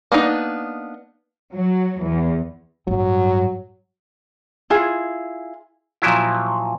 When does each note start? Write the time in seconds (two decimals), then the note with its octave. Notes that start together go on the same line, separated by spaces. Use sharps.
0.12 A#3 B3 D4 D#4
1.53 F#3
2.02 E2
2.87 A1 G2 F#3
4.70 E4 F4 G#4
6.02 A#2 F3 F#3 E4